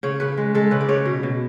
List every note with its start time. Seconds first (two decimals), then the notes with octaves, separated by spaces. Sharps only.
0.03 C#3 C#5
0.20 C#3 B4
0.38 G#3
0.55 G#3 A4
0.71 C#3 B4
0.81 D5
0.89 C#3 C#5
1.06 B2
1.23 B2